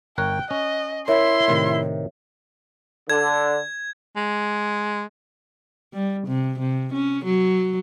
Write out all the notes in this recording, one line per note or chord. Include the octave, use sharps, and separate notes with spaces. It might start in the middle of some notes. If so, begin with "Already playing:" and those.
G1 A#4 C#5 G5 F#6
C#4 D#5
E4 A#4 C#5 E5 C6
A2 C3 D#3
D3 G#6
G#3
G3
C3
C3
C#4
F#3